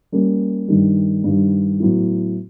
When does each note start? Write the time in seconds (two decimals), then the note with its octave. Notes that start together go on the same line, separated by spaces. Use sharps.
0.12 G3 A#3 C#4
0.68 G2 D#3 G3
1.24 G2 D#3 G3
1.80 A2 F#3 B3 E4